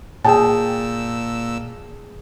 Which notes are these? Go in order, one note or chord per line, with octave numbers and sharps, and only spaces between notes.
A#2 G#4 G5 A5 E6